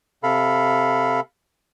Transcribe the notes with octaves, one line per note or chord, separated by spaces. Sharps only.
C3 A4 F5 B5